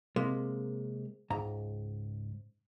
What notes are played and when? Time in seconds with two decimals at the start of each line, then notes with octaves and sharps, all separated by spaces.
0.16 C3 G#3 A#3
1.30 C#2 G#2 A#5